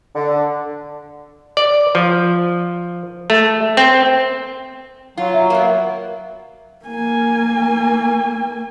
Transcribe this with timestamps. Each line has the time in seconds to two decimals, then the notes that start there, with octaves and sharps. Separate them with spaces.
0.15 D3
1.57 D5
1.95 F3
3.30 A3
3.77 C4
5.17 F#3 F4
5.34 E5
5.50 A#3 B3
6.84 A#3 G#5